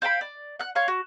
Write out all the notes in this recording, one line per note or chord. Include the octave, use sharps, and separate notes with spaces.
C5 F5 G5 B5
D5
F#5 F#6
C#5 F5 C6
F#4